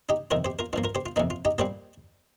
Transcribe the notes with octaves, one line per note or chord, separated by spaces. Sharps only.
D#4 G4
F2 C3 D#3 F4 A#4
G4 C5
F4 A#4
G2 F3 A#3 F4
F4 A#4
G4 C5
F4
F2 C3 F3 A#3 D#4
F4
D#4 G4
A#2 G3 A#3 G4 C5